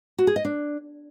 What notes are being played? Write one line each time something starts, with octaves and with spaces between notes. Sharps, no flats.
F#4
G#4
D#5
D4